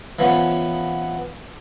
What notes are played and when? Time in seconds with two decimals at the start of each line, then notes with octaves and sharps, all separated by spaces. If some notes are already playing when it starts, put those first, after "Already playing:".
0.19 E3 F3 B3 C#4